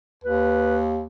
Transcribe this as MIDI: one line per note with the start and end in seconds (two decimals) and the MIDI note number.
0.24 1.06 39
0.24 0.76 71